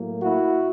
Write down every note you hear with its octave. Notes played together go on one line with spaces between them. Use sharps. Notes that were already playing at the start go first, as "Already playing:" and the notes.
Already playing: A2 F#3 A#3
E4 F#4